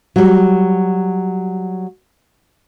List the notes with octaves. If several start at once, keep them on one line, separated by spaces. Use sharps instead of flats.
F#3 G3